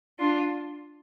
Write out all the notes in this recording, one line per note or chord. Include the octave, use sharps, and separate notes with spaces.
D4 F4